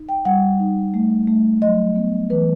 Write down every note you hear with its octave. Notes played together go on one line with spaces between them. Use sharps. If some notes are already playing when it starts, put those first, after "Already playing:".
Already playing: D#4
G5
G3 F#5
D#4
A3
A3
F#3 D#5
B3
E3 B4